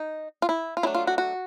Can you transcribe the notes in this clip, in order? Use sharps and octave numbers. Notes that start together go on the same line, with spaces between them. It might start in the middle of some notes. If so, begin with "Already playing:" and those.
Already playing: D#4
F4
E4
F4
F#3 A3 D4 E4
F4
F#4
F#4